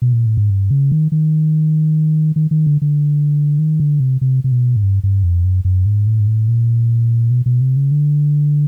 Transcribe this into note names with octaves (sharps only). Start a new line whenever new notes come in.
B2
A#2
A2
G#2
G2
C#3
D#3
D#3
D#3
D#3
D3
D3
D#3
D3
C3
C3
C3
B2
G#2
G2
G2
F2
F#2
F#2
G#2
A2
G#2
A2
A#2
B2
B2
C3
C#3
D3